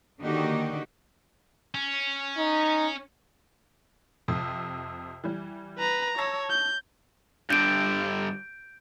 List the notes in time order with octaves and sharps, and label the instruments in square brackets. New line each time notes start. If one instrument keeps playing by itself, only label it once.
[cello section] D3 D#3 A#3 D#4 F#4 G4
[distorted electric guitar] C#4
[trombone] D#4
[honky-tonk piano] F2 C3
E3 G3
[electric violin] B4 A#5
[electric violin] C#5 [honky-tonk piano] A5 E6 A#6
[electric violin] G6
[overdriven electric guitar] G2 D3 [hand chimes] G6 D7